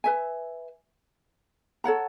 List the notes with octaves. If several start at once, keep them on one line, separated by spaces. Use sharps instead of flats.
B4 E5 G#5
A4 C#5 F#5 A#5